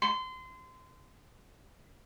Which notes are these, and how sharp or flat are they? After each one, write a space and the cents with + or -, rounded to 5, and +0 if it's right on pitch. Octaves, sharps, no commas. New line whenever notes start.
C6 -25